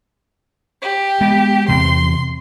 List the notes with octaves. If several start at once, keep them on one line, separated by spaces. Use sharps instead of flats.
G4
G#3 B3
E2 C3 C6